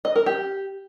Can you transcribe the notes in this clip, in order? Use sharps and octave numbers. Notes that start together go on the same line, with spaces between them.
D#5
A#4
G4